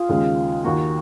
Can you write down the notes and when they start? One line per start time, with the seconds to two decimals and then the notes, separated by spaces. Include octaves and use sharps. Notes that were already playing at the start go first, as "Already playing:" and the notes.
Already playing: F4 G#4
0.09 D#2 C#3 G#3
0.64 D#2 D#3 A#3 F#4